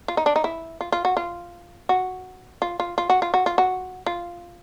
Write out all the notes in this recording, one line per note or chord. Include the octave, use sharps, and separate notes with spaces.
F4
D#4
D4
D#4
E4
F4
F4
F#4
F4
F#4
F4
F4
F4
F#4
F4
F#4
F4
F#4
F4